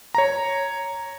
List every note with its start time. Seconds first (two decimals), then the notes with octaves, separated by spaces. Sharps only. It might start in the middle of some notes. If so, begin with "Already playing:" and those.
0.15 C#5 A#5